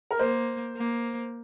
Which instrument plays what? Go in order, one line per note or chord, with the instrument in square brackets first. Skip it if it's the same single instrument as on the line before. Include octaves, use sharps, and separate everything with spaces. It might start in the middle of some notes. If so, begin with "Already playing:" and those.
[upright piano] A#4
[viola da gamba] A#3 [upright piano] C5
[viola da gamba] A#3